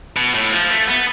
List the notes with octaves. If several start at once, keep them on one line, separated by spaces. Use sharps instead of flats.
B2
A2
F3
A3
B3